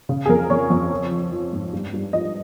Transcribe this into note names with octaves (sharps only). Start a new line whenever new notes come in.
C#3
G#4
F2 A#4
F2 C#5
F2
F3
F3
F3
G#2
G2
G2
F3 D#5